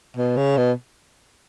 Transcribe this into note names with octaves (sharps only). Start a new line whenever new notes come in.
B2
C#3
B2